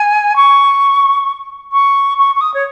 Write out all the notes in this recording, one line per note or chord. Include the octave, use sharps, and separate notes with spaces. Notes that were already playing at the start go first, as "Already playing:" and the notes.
Already playing: G#5
C#6
C#6
C#6
C#6
D#6
C#5